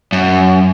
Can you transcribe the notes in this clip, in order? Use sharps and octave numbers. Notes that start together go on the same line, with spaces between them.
F#2